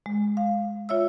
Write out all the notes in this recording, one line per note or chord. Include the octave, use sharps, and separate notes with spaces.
G#3
F5
F4 C#5 E5 E6